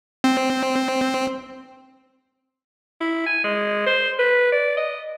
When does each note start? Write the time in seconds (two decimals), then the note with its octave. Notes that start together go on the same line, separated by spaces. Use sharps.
0.24 C4
3.00 E4
3.26 G#5
3.44 G#3
3.86 C5
4.19 B4
4.52 D5
4.77 D#5